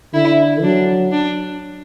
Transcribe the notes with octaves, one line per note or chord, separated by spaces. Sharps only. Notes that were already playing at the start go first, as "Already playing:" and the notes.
D3 E4
F#3 D4
D4